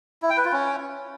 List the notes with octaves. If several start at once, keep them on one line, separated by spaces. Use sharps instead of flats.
E4
G5
B4
F4
C#4